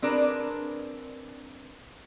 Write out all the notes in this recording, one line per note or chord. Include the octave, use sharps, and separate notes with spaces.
C4 D4 G#4 A#4 B4